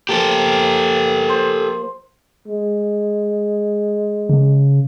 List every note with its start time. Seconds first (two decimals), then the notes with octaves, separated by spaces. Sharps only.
0.09 F3 A#3 G4 A4
1.29 C5
2.48 G#3
4.29 C#3